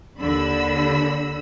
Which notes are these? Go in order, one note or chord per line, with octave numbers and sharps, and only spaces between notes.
D#2 D3 B5 E6